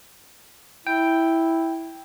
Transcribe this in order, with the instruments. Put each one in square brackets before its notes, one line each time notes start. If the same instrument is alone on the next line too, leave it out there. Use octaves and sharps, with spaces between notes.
[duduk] E4 [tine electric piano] G5